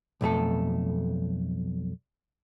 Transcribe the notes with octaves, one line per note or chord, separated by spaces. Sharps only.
B1 F2 A3 A4